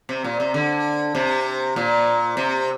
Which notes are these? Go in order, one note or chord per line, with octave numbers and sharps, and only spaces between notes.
C3
A#2
C3
D3
C3
A#2
C3